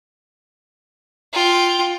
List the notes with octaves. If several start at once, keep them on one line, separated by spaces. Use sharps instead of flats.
F4 G5